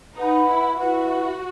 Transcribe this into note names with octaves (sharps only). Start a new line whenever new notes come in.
D#4 B4 F#5 B5
E4
E4 F#4 B4 F#5